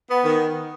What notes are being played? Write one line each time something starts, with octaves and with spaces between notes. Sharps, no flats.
B3
D#3